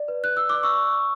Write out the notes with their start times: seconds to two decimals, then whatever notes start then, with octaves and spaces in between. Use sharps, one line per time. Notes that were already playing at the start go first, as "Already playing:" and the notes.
Already playing: D5
0.08 B4
0.24 F#6
0.37 E6
0.49 D5 D6
0.63 C#6 E6